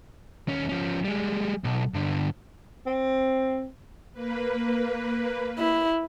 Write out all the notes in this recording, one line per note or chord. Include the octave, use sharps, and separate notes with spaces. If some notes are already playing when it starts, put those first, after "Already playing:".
D#2 C#4
F3 C#4
G3 G#3
B1
G2 D3
C4
A#3 B4
E4